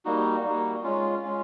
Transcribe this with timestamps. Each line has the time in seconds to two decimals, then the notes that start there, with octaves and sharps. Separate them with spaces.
0.05 G3 A#3 D#4 F#4
0.44 G3 A#3 D#4 F#4
0.83 G#3 C#4 F4
1.23 G#3 C#4 F4